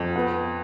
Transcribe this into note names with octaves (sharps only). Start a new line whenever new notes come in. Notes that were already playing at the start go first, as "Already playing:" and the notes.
Already playing: F2
B3